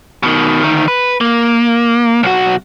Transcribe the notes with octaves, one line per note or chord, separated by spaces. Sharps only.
B2 D#3
D2 D#3
B4
A#3
B1 F#4